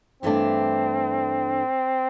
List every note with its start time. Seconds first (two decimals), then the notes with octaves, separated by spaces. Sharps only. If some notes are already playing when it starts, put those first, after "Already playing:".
0.23 G2 E3 A3 C4 D4